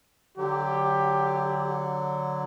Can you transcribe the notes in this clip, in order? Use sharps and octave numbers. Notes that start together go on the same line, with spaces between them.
D3 F#3 G4